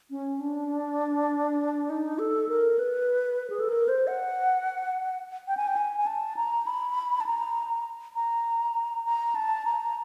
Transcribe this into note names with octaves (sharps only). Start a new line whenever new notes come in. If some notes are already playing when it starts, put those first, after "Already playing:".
C#4
D4
D#4
A4
A#4
B4
G#4
A4
A#4
C5
F#5
G5
G#5
G5
G#5
G#5
A5
A#5
B5
A5
A#5
A#5
A#5
A5
A#5